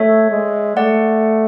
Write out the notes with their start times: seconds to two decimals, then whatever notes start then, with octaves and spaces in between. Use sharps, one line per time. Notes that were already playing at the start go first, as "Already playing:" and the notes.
Already playing: A3 C#5 E5
0.31 G#3
0.77 A3 D5 F#5